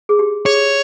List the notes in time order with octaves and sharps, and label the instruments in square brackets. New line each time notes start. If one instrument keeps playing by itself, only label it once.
[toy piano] G#4
G4
[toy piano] G#4 [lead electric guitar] C#5